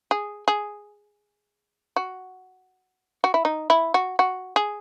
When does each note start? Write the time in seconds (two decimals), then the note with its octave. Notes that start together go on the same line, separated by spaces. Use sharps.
0.11 G#4
0.48 G#4
1.96 F#4
3.24 F#4
3.34 E4
3.45 D#4
3.70 E4
3.94 F#4
4.19 F#4
4.56 G#4